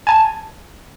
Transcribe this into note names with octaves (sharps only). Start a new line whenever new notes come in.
G#5 A5